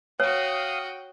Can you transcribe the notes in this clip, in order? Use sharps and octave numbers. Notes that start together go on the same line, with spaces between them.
F#4 C#5 F5 G5 D#6